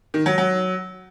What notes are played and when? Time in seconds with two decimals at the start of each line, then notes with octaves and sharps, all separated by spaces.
0.14 D#3
0.26 F#3
0.38 F#3